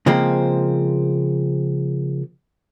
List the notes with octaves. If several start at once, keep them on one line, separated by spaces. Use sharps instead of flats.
C#3 F3 G#3 A#3 C4